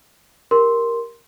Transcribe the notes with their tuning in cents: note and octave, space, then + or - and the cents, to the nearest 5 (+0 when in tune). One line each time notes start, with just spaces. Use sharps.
G4 +0 A#4 +0 C6 +0